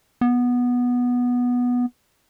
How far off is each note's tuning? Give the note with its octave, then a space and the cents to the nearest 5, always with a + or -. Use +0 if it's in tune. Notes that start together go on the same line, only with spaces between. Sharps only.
B3 -10